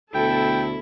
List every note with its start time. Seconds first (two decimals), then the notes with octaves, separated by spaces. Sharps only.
0.15 D2 B2 E4 A4 G5